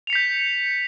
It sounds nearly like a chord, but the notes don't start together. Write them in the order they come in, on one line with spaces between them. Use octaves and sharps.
F7 C#7 B6 G6